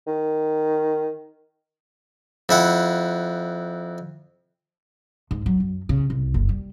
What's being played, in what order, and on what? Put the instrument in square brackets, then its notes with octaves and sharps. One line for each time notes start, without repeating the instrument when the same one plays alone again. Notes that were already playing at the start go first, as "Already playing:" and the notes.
[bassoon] D#3
[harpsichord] F2 E4 F#5
[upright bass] G#2
F#3
F#2
C#3
C2
F#1
G3